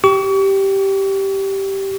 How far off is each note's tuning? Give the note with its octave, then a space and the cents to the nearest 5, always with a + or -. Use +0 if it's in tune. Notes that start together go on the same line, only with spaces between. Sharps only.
G4 -10 C#6 +40